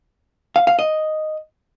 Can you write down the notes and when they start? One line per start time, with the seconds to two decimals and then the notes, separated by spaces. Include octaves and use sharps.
0.56 F5
0.67 F5
0.79 D#5